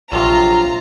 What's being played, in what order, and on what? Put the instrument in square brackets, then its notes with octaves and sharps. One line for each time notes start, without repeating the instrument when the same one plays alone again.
[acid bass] A#1 [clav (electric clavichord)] C3 F#3 A4 [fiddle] F4 [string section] A#5